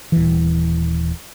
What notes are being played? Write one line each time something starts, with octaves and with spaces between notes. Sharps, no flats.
D#1 E3